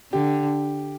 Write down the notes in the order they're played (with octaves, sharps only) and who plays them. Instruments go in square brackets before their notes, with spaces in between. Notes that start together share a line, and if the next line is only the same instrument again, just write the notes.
[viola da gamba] D3 [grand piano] G4